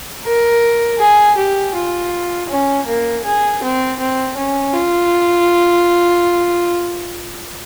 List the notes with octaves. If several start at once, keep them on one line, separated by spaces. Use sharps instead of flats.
A#4
G#4
G4
F4
C#4
A#3
G#4
C4
C4
C#4
F4